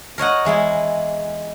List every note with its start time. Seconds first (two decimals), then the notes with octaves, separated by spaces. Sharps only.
0.18 A#4 C#5 D#5 F#5
0.45 E2 G#3 E4 G#5